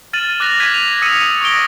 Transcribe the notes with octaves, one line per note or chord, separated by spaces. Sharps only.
F6 A6 D#7 E7 F#7
D6 F#6 A6 A#6 F7
F#6 G#6 B6 D#7
F7
D#6 E6 C#7 D#7
C#6 D#6 A#6 D7 G7